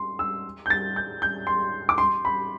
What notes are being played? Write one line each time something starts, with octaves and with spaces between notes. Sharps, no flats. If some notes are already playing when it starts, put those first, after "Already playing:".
Already playing: C6
E6
G6
A6
G6
G6
C6
D6
C6
B5